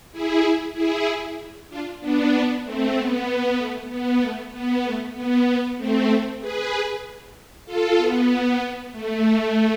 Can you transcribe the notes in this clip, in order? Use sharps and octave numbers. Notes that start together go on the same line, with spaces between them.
E4 G#4
E4 G#4
D4 F4
B3 D4
B3 D4
A3 C4
B3
A3
B3
A3
B3
A3
B3
B3
A3 C4
G#4 B4
F4 A4
B3
A3